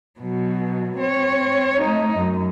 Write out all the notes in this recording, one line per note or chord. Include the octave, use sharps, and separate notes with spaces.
B2 F#3
C4 C#5
A3 D#4
F#2